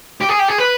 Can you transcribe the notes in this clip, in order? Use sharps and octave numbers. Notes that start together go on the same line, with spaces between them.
G4
G#4
G4
G#4
B4